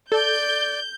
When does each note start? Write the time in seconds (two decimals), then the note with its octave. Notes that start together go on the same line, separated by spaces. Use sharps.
0.12 A4 D5 G6